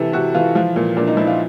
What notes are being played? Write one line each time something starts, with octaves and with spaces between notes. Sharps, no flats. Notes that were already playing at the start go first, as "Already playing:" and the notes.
Already playing: C3 E3 A4
C3 F#4
E3 F4
F3 F4
A#2
A#2 D4
D#4
F3 E4
F4